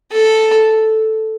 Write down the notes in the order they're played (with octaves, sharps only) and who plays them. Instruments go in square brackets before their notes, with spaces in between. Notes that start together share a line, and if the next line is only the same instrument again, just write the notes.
[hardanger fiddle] A4